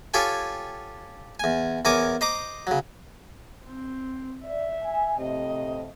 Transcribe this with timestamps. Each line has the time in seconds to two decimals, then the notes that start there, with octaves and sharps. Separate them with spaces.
0.14 F4 G4 A4 C#5 G5 G#5
1.40 E2 G#5
1.85 E2 A#4 C#5 G#5 D6 D#6
2.21 C5 D#5 A#5 D6
2.67 C#3 F#3
3.64 C4
4.45 D5 E5
4.83 G#5
5.18 F2 A2 C3 D#5